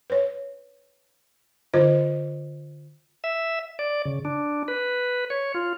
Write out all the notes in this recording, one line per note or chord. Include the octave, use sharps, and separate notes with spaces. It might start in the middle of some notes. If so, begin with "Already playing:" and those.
B4 C#5
D3 F4 C5 D#5
E5
D5
C#3
D4
B4
C#5
F4